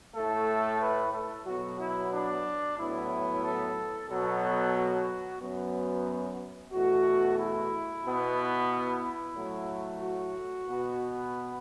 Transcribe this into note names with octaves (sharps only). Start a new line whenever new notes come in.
A2 A3 A4
B4
A4
B2 F#3 B3 F#4
E4
D4
A2 F#3 B3 E4
A4
B2 F#3 B3 A4
F#4
F#2 F#3 B3
E2 B2 A3 F#4
E4
B2 B3
E4
A2 F#3 A3
F#4
B2 B3